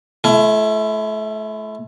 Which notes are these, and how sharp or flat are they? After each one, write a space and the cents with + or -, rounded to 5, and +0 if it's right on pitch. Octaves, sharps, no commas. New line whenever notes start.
A3 -30 E4 +30